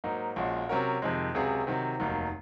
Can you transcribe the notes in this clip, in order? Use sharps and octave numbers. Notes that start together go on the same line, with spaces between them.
G#2 F#3 A#3 D#4
A#1 A#2 G#3 C#4 F#4
C3 F#3 C#4 F#4 A#4
F2 C3 D#3 G#3
C#2 C3 F#3 C#4 G#4
C3 D#3 F#3
F1 D#2 D#3 F#3